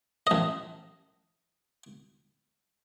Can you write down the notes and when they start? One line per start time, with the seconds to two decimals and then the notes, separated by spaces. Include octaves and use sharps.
0.27 A1 D#5